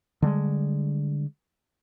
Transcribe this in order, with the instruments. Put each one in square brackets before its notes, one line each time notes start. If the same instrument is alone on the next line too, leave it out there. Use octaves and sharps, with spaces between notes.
[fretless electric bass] D3 G3 G#3